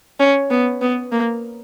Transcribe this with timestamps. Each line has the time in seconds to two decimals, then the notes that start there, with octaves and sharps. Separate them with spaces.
0.20 C#4
0.50 B3
0.81 B3
1.12 A#3